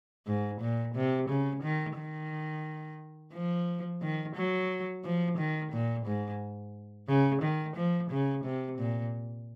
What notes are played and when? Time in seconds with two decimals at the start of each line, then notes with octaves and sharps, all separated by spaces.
0.26 G#2
0.61 A#2
0.95 C3
1.29 C#3
1.63 D#3
1.97 D#3
3.33 F3
4.02 D#3
4.36 F#3
5.04 F3
5.38 D#3
5.72 A#2
6.06 G#2
7.08 C#3
7.42 D#3
7.76 F3
8.10 C#3
8.44 C3
8.79 A#2